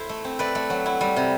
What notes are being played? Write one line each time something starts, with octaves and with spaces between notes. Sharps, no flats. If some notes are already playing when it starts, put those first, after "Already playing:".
Already playing: E4 A4 C5
A3
C4
A3 B4 D5
A3
F#3
E4
G3
C3